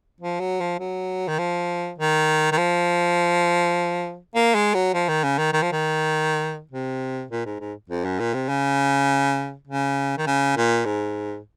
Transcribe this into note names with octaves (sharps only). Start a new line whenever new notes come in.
F3
F#3
F3
F#3
D#3
F3
D#3
D#3
F3
A#3
G#3
F#3
F3
D#3
C#3
D#3
D#3
F3
D#3
C3
A#2
G#2
G#2
F2
F#2
A#2
C3
C#3
C#3
D#3
C#3
A#2
G#2